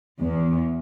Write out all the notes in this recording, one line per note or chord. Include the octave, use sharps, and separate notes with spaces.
E2